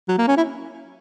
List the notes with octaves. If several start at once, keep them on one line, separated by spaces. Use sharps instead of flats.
F#3
A#3
C#4
E4